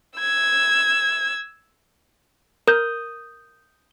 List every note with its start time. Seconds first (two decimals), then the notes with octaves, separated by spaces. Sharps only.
0.19 E6 G#6
2.68 A#4 D#6 G6